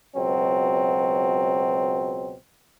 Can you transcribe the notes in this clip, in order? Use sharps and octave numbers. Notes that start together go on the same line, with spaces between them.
C#2 B2 F#3 C4